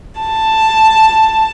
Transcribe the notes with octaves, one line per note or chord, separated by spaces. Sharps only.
A5